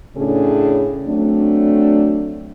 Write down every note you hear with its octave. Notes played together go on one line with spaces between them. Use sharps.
A2 C#3 C#4 D4 G#4
F#3 A3 C4 D4